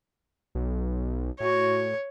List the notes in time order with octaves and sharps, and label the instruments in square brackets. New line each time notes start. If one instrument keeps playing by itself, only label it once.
[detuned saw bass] B1
[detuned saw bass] A2 [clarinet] F#4 [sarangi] C#5